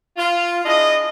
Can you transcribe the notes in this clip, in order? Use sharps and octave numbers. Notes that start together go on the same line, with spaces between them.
F4
D4 E4 G#4 D#5